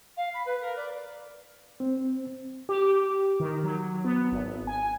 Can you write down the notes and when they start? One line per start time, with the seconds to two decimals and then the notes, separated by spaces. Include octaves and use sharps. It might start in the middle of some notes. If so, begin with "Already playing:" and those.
0.16 F5
0.33 B5
0.45 B4
0.60 A#4
0.75 D5
1.80 C4
2.69 G4
3.40 D#3
3.64 F#3
4.05 B3
4.31 G#1
4.67 G#5